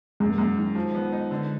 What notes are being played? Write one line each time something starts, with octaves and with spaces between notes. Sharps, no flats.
F#2 G#3
A#3
F#2 G#3
D#3
F3
B3
D#4
D3